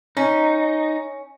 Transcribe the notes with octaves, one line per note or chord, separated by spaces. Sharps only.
C#4 D#4